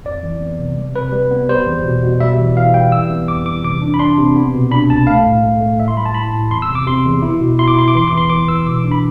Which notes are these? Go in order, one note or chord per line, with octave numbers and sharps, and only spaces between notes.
F2 D5
E3
B3
C3
G3
C3 B4
G3
B3
G3 C5
E2
B2
B2
G3 E5
E3
E3 F5
G3 G5
E3 E6
B3
F2 D6
E3 D6
C3 D6
D4
B5
D4 C6
C3
B3
B2
D4 B5
C2 A5
A3 F5
A2
A3
A3
A2 E5
C6
G3 B5
A5
E4 B5
A2
E2 C6
E6
C3
D6
C3 C6
E2
E4
B2
E4 C6
D6
E4 C6
D6
E3 C6
D6
E2 C6
E3 D6
E3 E6
B2 D6
D4
B5